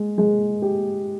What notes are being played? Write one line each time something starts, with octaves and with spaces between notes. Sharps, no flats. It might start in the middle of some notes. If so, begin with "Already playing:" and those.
Already playing: G#3
G#3
G4